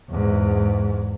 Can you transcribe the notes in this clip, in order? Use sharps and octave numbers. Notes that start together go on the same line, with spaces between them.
E2 G#2